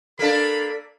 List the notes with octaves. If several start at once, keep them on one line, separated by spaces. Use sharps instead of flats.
A#3 D4 A4 B5